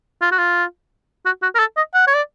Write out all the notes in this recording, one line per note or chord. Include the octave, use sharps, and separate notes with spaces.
F4
F#4
F4
F#4
F#4
A#4
A4
D#5
F#5
C#5
D5